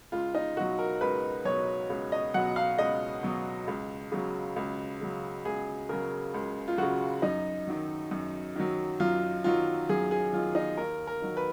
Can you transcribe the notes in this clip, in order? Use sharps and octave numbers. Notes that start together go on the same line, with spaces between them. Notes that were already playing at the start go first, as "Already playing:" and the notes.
C#2 F4
D#4
B2 F#3 F#4
A#4
C#2 B4
B2 F#3 C#5
C#2
D#5
B2 F#3 F#5
F5
C#2 D#5
B2 F#3
C#2
C#3 F#3
C#2
C#3 F#3
C#2 G#4
C#3 F#3 A#4
C#2
F4
C#3 F#3 F#4
F#2 D#4
D#3 F#3
F#2
D#3 F#3
F#2 F4
D#3 F#3 F4
F#2 G#4
G#4
D#3 F#3 F4
D#4
D#2 A#4
A#4
D#3 F#3
B4